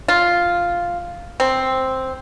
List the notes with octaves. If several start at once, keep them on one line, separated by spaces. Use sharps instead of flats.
F4
C4